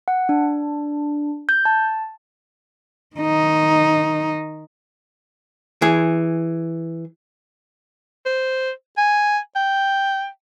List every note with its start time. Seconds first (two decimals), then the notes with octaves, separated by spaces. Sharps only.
0.08 F#5
0.29 D4
1.49 G6
1.65 A5
3.16 D#3 D#4
5.82 E3 G#4
8.26 C5
8.97 G#5
9.56 G5